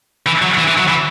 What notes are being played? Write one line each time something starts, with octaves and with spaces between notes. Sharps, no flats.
E3
F#3
E3
E3
F#3
E3